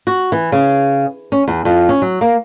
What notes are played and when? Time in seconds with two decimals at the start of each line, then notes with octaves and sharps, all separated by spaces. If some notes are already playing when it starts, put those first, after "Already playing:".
0.07 F#4
0.32 E3
0.52 C#3
1.32 C#4
1.48 E2
1.65 F2
1.89 C#4
2.02 F#3
2.21 A#3